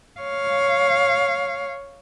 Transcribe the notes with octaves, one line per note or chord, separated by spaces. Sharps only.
C#5 F5